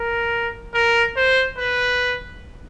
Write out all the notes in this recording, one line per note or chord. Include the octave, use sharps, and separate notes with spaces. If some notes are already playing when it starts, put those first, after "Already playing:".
Already playing: A#4
A#4
C5
B4